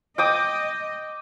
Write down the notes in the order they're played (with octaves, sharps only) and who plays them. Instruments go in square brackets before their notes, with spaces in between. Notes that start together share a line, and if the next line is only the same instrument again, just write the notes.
[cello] D#5 [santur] G5 D6 D#6